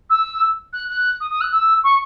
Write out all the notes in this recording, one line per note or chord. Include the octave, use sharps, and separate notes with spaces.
E6
F#6
F#6
D#6
D#6
F#6
E6
C#6